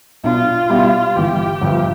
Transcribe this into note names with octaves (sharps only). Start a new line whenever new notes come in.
B1 B2 B3 D4 F4
B2 G3 B3 E4 G4
G1 G2 E3 G4
G1 G2 F3